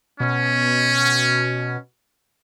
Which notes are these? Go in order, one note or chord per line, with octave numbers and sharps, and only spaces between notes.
B2 C#4